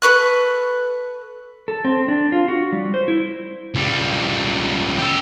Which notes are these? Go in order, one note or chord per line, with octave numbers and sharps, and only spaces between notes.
A4 B4 C#6 F#6
A4
C4
D4
F4
F#4
G3
C5
E4
C#2 G3
G4 A4